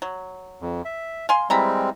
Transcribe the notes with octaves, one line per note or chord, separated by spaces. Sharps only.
F#3
F2
E5
F5 G#5 C6
E3 G3 G#3 C4 A#5 B5